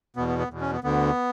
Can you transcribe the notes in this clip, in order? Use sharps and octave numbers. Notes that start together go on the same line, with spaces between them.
E2 B2 B3
B3
B3
E2 B2
C#4
B3
D2 D3 B3